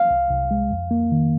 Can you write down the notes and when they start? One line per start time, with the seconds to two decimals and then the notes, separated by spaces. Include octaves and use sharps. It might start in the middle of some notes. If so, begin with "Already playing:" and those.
Already playing: F5
0.10 C2
0.31 C2
0.51 G#3
0.71 F2
0.91 A#3
1.12 D#3